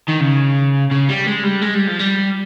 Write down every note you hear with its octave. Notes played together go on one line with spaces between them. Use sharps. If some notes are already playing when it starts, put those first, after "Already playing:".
D#3
C#3
C#3
G3
G#3
G3
G#3
G3
F3
G3